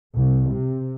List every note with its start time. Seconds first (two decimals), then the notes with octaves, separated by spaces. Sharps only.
0.16 C2
0.51 C3